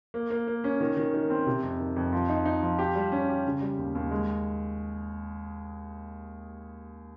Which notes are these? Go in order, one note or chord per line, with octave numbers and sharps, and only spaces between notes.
A#3
A#3
A#3
C#4
D#3
D#3
D#3
C4
C3
F2
D#3
F2
F3
D#4
D#4
F3
G4
G3
C#4
G4
C#3
G3
D#2
D#2
G#3